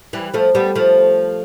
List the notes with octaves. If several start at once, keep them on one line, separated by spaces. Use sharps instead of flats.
E3 G3
F3 A3
G3 B3
F3 A3